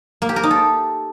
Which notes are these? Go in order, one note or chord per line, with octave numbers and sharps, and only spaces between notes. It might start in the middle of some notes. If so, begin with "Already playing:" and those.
A#3
G4
A#4
D#4
A4